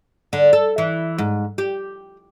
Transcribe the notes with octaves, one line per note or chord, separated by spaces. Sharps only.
D3
A4
E3
G#2
G4